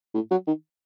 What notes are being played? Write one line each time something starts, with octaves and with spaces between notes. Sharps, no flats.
A2
F#3
D#3